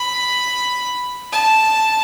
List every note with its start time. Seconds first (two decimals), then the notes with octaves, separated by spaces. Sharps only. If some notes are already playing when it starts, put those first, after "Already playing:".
Already playing: B5
1.32 A5